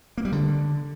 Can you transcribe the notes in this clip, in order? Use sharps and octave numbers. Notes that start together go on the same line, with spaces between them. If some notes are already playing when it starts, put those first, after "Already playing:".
A#3
G3
D3